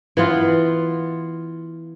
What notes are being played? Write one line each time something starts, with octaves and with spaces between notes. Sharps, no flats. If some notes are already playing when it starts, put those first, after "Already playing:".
E3 B3 F4